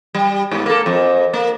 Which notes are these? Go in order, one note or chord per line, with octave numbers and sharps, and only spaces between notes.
G3
G#2 B3
A#3 A4
F2
A#3